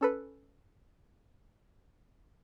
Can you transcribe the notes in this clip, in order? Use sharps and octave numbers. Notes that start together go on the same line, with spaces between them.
C#4 A4 B4